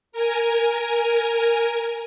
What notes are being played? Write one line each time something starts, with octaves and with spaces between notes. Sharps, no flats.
A#4 G#5